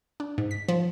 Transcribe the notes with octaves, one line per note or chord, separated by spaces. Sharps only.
D4
G#2
B6
F3